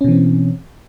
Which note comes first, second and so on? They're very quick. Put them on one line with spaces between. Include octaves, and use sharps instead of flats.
C#4 B2 E3 C4